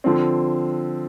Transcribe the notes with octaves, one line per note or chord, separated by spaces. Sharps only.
D3 F3 C4